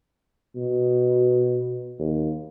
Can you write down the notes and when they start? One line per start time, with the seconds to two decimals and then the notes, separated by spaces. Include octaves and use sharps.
0.56 B2
1.99 D#2